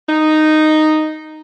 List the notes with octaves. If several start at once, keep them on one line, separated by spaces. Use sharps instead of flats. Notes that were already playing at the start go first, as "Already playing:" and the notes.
D#4